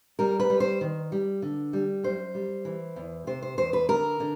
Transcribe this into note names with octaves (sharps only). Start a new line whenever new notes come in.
G3 A#4
B4
G3
C5
D#3
G3
D3
G3
F#2 C5
G3
E3
E2
C3 C5
C5
E2 C5
B4
D3 A#4
D3